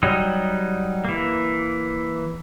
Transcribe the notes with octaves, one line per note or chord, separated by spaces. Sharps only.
F#3 G3 D#4
E3 A#3